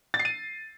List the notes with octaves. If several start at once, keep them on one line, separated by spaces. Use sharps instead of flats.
A6
C7
D#7